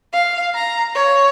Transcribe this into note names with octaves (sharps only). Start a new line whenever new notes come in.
F5
A#5
C#5